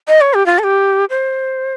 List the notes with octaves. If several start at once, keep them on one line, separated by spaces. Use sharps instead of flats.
D#5
C#5
G4
F4
A4
G4
C5